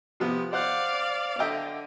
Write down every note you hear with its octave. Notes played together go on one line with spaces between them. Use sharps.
C3 F3 B3
C5 D5 F5 F#5 F#6
D3 D#5 E5 G5